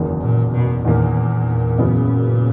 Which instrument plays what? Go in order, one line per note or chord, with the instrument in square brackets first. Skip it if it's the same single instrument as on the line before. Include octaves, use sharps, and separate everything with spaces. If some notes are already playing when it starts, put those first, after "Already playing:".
Already playing: [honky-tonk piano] F#1 E2 D#3 A#3
[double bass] A#2
B2
[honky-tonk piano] E2 D#3 A#3 [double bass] A#2
[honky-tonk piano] F#2 C#3 E3 B3